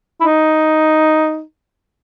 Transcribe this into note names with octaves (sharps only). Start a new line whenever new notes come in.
E4
D#4